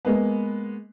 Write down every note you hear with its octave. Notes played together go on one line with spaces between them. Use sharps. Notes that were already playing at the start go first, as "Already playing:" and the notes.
G#3 A#3 B3